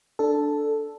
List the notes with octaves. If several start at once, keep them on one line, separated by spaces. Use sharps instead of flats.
D4 A4